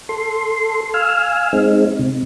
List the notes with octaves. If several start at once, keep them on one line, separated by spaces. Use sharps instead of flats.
A4 C6
F5 G#5 E6 F6
G#3 C4 D#4
C3